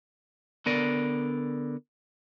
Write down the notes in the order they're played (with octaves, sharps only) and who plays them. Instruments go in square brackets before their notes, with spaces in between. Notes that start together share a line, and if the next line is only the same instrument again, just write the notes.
[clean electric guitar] D3 B3 A#4 D5